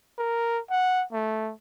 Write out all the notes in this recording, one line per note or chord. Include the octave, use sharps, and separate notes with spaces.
A#4
F#5
A3